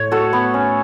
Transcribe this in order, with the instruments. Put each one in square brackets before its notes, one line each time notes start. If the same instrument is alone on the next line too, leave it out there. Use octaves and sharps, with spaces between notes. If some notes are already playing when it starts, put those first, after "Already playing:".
Already playing: [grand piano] A2 A3 [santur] C#5
[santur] F#4 A4
B3
C#4